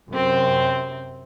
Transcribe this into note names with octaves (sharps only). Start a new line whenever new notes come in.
F#2 C3 C4